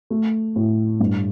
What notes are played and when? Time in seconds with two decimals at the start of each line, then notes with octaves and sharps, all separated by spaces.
0.10 A3
0.56 A2
1.00 G2